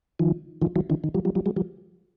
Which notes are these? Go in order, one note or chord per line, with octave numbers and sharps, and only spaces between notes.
D#3 F3
D#3 F3
E3 F#3
D3 E3
D#3
F3 G3
F3 G3
F3 G3
F#3 G#3
F3 G3